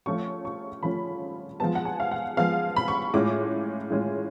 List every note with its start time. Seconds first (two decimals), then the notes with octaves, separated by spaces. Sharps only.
0.06 F3 A3 C#4 F4 C#6
0.45 C#6
0.83 F3 A3 C#4 F4 B5
1.60 F3 G#3 B3 A5
1.75 F#5
1.85 G#5
2.00 F5
2.11 F#5
2.37 F3 G#3 B3 F5
2.76 B5
2.88 C#6
3.14 A2 G#3 C#4 F4 D6
3.90 A2 G#3 C#4 F4